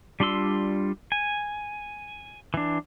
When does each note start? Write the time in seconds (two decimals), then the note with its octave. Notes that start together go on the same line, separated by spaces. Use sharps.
0.20 G3 D4 F4 C6 E6
1.12 G#5
2.54 E3 D4